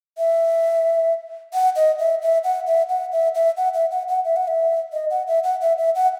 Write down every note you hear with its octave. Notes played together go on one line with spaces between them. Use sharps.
E5
F#5
D#5
E5
E5
F#5
E5
F#5
E5
E5
F#5
E5
F#5
F#5
E5
F#5
E5
D#5
F#5
E5
F#5
E5
E5
F#5